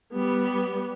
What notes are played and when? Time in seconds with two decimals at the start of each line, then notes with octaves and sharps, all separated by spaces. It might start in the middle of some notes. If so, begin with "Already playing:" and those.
0.13 G3 B3